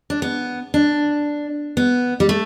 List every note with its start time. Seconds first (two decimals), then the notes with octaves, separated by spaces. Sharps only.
0.10 D4
0.22 B3
0.74 D4
1.77 B3
2.20 G3
2.29 A3